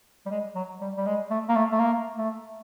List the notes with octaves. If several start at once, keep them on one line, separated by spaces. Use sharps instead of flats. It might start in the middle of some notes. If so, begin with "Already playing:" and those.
G3
G#3
F#3
G3
G3
G#3
A3
A#3
A3
A3
A#3
A3